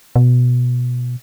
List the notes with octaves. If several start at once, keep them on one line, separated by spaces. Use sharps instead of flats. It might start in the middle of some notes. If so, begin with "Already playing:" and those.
B2